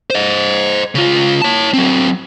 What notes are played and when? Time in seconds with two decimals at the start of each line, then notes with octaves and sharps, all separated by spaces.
0.10 C5 D#5
0.95 C#3 F4
1.42 C#5 A5
1.73 F#3 C4